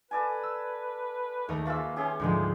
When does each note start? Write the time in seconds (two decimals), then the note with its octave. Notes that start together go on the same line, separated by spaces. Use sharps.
0.11 A4 B4 D5 G#5
0.43 E6
1.49 D#2 A3 A#4 D#5
1.66 G#3 A#3 F4 B4 E5 C#6
1.96 C#4 G4 G#4 C6
2.20 D2 G#2 F3 G#3 D#4